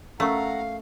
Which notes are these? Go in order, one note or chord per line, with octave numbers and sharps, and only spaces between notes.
A3 C#4 A#4 F5 F#5 A#5 C#6